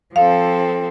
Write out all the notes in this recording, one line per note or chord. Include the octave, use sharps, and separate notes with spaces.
F3 C4 A4 F5